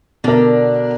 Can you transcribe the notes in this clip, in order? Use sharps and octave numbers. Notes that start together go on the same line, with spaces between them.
B2 D3 D4 A#4